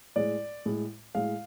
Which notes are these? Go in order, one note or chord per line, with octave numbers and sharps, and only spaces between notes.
A2 G#3 D5
A2 G#3
A2 G#3 F5